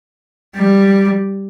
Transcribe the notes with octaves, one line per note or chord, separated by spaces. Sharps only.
G3